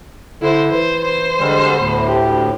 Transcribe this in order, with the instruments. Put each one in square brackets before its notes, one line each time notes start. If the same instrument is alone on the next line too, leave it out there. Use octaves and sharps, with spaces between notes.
[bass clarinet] D3 [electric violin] E4 C5
[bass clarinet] E3 [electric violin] C5
[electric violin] C5
[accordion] D3 G3 G#3
[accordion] D2 A2 [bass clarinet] B3
[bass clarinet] G4